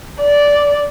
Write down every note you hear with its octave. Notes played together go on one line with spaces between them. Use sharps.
D5